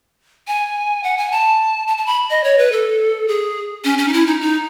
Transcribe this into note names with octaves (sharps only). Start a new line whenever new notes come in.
G#5
F#5
G#5
A5
A5
A5
B5
D#5
C#5
B4
A4
G#4
C#4
C#4
D#4
E4
D#4
D#4